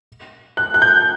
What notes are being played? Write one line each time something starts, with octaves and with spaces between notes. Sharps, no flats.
F#6
F#6
G6